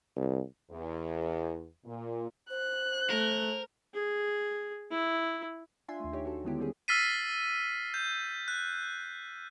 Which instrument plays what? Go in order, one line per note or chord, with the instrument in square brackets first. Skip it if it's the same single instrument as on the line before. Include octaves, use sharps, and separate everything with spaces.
[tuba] C2
[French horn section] E2
A#2
[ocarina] C5 [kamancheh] F#6
[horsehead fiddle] A3 [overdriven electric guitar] A#4
[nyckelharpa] G#4
E4
[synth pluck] D4 F4 E5 G#5 C6
D#2 A3
D#4 G4 C#5
F#4 A4
D3 D#3 G#3 B3 E4 G4
G3 A3 C4 C#4 G4 G#4
[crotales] E6 F6 A6 B6 C7 D#7
G6
F#6